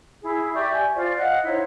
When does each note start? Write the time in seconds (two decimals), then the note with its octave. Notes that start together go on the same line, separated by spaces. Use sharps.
0.22 E4 G#4
0.54 G4 D5 E5 C#6
0.72 G#5
0.95 F4 C5 D5
1.18 D#5 F5 F#5 F#6
1.45 D#4 E4 C5 C#5